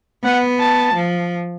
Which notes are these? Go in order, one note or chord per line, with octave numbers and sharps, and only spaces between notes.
B3 F#5
A5
F3